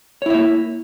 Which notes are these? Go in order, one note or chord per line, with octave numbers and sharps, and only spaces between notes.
A#3 E4 C#5 E5